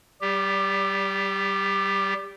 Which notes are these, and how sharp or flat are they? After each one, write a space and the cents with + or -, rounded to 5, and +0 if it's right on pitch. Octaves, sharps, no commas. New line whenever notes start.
G3 -25 G4 +20